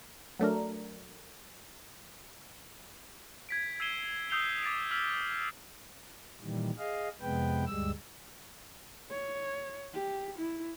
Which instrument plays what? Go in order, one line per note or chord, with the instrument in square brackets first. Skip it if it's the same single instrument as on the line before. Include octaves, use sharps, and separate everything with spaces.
[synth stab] F#3 A3 D4 A#4
[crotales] G#6 B6 D7
E6 G#6 C7 D#7 E7 G7
D#6 E6 G6 C7 F7 G7
D6 A6 B6 D7
E6 F6 B6
[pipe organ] A#2 D#3 E3 G3
G#4 D#5 F5
F2 C3 G#3 B3 B4 G5
D2 G2 G3 G#3 E6
[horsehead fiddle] C#5
G4
E4